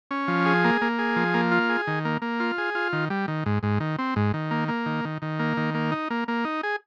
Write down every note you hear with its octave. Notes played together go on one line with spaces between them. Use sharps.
C#4
F3
G#4
A#3
A#3
G#4
F3
A#3
F4
G#4
D#3
A#3
A#3
F4
G#4
F4
D#3
G3
D#3
G#2
G#2
D#3
C4
G#2
D#3
A#3
A#3
D#3
D#3
D#3
A#3
D#3
A#3
D#4
A#3
A#3
D#4
G#4